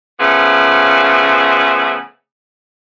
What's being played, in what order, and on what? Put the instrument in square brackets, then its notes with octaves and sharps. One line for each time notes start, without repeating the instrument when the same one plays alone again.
[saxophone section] C#3 F3 A3 B3